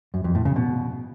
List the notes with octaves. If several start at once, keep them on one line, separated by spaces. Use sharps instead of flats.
F#2
F2
A2
C#3
B2